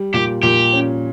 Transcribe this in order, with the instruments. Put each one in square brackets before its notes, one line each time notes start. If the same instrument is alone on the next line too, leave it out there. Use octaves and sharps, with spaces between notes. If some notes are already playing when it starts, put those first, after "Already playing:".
Already playing: [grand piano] G3
[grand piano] A#2 [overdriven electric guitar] G4
[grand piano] A#2 [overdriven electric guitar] G4
[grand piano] C#4